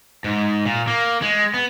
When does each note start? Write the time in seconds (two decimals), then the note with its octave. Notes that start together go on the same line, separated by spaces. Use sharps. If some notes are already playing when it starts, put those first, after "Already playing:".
0.24 G#2
0.66 A#2
0.87 A#3
1.22 G#3
1.54 B3